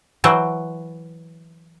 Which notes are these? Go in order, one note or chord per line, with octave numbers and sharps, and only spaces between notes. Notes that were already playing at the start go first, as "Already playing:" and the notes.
E3 F#3 C5 G5